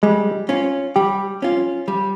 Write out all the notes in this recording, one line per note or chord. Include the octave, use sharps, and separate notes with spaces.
G3 G#3
C#4 F4
G3 G4
C#4 F4
G3